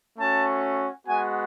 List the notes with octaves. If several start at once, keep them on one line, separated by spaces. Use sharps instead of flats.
A3 C#4 F#4 A5
G#3 B3 F#4 G#5